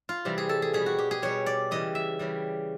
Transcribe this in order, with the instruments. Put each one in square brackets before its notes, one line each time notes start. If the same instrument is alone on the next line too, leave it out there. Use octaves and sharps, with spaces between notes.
[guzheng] F4
C3 E3 G3
G#4
A4
G#4
B2 G3 G#4
F#4
G4
G#4
B2 G3 C#5
D5
C#3 E3 G3 D#5
E5
C#3 E3 G3